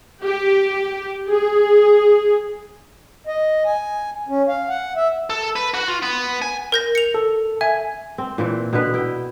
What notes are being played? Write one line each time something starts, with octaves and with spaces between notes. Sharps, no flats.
G4
G#4
D#5
G#5
C#4
F5
F#5
E5
A4
B4
F#4 F#5
F4
B3
G#5
A#4 G6 A#6
C#7 F7
A4
E5 G#5
C4
A#2 E3 C4
B2 D3 B3 B4
E4 G5